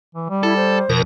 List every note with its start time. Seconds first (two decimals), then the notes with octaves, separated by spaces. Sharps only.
0.15 E3
0.30 G3
0.43 E4 A4
0.56 C5
0.90 F2 B2 A#4